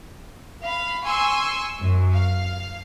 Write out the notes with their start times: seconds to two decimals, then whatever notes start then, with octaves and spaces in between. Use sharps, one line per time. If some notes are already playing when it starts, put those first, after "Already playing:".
0.63 F5 B5
1.04 G#5 C6 C#6 E6
1.80 F#2
2.12 F5